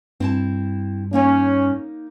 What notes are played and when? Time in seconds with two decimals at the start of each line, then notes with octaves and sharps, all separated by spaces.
0.20 G2 C4 E4 A5
1.13 A#3 C#4 D#4 C#5